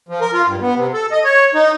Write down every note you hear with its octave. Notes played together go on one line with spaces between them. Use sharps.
F3
A#4
F4
G2
B3
C3
A4
D#5
C#5
D#4